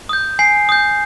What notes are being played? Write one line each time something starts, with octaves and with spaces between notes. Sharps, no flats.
D#6 G6
G#5 C7
D#6 G6